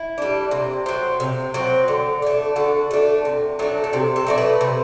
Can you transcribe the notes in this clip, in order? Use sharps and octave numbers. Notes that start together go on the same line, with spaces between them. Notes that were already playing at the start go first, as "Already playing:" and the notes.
Already playing: E4
G3 D4
C3
F#3 C4
C3
F#3 C4
D3
A3 D4
D3 F#4
A3 D4
C3
F#3 A3 D4
A4
C3 G4
A4
F#3 A3 D4
B4
C3